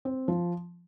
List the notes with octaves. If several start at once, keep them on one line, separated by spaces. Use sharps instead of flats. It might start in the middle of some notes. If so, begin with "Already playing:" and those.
C4
F3